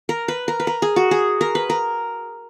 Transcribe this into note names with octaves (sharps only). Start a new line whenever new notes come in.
A#4
B4
A#4
B4
A#4
G#4
F#4
G#4
A#4
B4
A#4